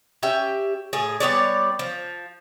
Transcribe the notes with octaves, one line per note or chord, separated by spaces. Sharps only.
C#4 G4 E5 G5
A2 G#4
G3 B3 C#5 D5
F3